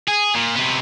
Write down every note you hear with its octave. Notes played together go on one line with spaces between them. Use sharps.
G#4
A#2
C3 B3